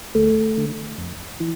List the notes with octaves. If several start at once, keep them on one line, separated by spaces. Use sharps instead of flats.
D2 A3
D3
F2
E3